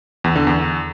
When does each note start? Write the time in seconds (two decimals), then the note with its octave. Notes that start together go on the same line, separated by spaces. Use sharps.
0.24 E2
0.36 D3
0.47 E2